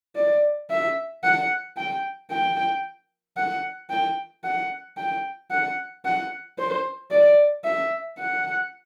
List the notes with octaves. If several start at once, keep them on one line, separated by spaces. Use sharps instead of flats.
D5
E5
F#5
G5
G5
F#5
G5
F#5
G5
F#5
F#5
C5
D5
E5
F#5